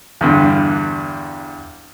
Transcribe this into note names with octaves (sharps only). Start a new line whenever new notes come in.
E2 G2 D3